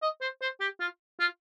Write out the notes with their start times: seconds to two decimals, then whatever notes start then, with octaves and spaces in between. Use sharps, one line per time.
0.02 D#5
0.21 C5
0.41 C5
0.60 G4
0.80 F4
1.20 F4